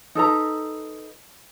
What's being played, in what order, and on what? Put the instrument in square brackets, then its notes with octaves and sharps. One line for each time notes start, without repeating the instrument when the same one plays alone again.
[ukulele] D#4 A4 B4 A#5